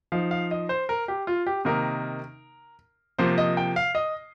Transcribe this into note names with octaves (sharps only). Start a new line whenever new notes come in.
F3 D#4 F5
F5
D#5
C5
A#4
G4
F4
G4
C3 D#3 A#3 D#4 A#4
C3 F3 A#3 C5
D#5
G5
F5
D#5